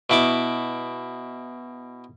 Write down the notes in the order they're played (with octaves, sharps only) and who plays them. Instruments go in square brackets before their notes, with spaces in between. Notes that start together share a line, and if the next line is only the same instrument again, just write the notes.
[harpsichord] B2 E4 D6